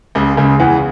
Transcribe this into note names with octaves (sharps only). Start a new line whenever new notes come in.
C#2 C#3
C#2 C#3
E2 E3